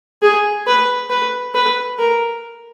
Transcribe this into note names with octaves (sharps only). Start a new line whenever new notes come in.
G#4
B4
B4
B4
A#4